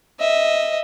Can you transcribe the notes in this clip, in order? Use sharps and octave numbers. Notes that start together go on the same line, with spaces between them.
D#5 E5